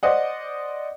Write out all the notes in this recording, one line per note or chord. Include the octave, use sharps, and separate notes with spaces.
C5 D5 D#5 F#5